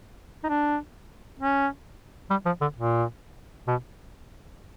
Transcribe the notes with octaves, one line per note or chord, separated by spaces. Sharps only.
D#4
D4
C#4
G3
F3
D3
A#2
B2